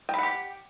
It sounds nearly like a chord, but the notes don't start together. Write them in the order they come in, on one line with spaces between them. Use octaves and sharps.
G5 B5 F#5 G4